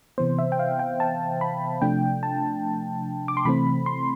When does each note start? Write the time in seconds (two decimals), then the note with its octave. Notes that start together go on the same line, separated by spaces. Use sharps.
0.18 C3 E3 B3 C5
0.39 E5
0.52 G5
0.59 F5
0.79 G5
1.00 A5
1.41 B5
1.81 C3 F3 A3 D4 G5
2.23 A5
3.28 D6
3.37 C6
3.45 C3 E3 A3 C4 B5
3.86 C6